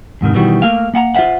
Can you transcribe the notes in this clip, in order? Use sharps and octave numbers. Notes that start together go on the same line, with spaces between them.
E2 G#2 C3 D#3
B2 D#3 E3 G3 F#4
A3 A#3 F5
A#3 F#5 A5 A#5
F4 C5 C#5 E5 F#5